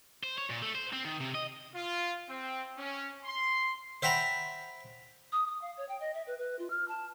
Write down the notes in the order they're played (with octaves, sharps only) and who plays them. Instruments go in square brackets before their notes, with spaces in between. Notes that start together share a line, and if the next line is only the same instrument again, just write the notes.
[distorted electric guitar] C5
C#5
A#2
A3
C5
C4
D#3
C3
D#5
[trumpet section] F4
C4
C#4
C6
[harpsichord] C5 E5 F#5 G5 A#5 B5
[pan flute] D#6
D#6
F5
C#5
G5
D#5
E5
B4
B4
F4
F6
A5